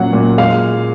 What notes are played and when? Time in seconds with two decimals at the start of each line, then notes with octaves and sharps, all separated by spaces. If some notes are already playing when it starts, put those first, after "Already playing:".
Already playing: A#2 F#3 C#4 F#5
0.13 A#2
0.38 G#3 F5